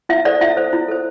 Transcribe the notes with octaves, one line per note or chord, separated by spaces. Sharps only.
E4 E5
A4 C5 D5
E4 E5
A4 C5
E4
A4 C5